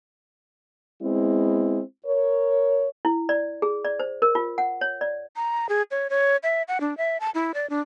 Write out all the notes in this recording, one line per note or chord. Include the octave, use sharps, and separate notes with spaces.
G#3 B3 C4 E4
A#4 C#5
E4
D5
G#4
D5
C5
A#4
F4
F#5
C#5
D5
A#5
G#4
C#5
C#5
E5
F#5
D4
E5
A5
E4
D5
D4